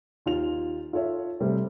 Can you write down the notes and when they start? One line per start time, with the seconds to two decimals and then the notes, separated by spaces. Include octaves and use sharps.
0.26 D#2 F4 F7
0.93 F4 A4 C#5 E5
1.40 C3 G3 A3 C4